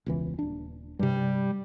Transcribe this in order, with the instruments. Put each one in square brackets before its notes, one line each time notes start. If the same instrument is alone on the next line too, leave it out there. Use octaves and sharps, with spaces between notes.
[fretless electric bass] E1 C#2 E3
D#1 D4
[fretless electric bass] G2 C3 [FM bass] G3